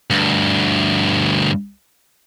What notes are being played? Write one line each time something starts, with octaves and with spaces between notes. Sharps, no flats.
D2 G2